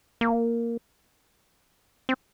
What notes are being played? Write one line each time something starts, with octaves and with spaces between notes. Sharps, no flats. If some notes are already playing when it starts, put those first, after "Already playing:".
A#3
C4